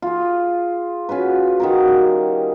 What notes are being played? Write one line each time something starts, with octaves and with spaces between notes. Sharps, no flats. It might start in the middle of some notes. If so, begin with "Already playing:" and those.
F4 G#4
C#4 F4 F#4 B4
D#3 F#4 A#4
G3